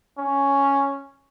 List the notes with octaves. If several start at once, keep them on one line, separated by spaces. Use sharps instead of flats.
C#4